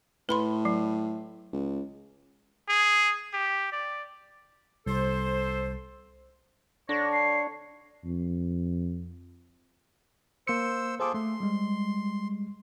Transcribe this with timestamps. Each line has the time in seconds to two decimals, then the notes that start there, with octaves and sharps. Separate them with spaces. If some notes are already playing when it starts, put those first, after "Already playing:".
0.29 A2 B4 B5 C6
0.65 F#3
1.53 C#2
2.69 G#4
3.34 G4
3.72 D5
4.86 C2 A4 C5
6.89 D3 D4 C#5 A#6
7.13 C7
8.04 F2
10.47 A#3 C5 E6 C#7
11.00 F4 G#4 A4 C5 D6
11.14 A3 C6
11.40 G3 G#3